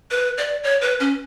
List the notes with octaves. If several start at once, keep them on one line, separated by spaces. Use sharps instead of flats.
B4
D5
C#5
B4
C#4